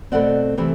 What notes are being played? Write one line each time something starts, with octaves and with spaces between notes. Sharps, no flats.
B2 A3 C4 D5 F#5
C3 E3 A3 C4